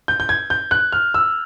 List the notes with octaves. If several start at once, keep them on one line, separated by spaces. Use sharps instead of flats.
G6
G6
G#6
G6
F#6
F6
E6